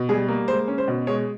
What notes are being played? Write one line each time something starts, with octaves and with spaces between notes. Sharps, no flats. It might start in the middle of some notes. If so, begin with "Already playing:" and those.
Already playing: B2
G3 G#4
A#3
G#3 C5
C#4
C5
B2
G#3 C#5